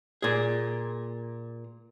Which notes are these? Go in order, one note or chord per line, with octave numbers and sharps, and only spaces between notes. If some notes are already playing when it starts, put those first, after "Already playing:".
A#2 G#4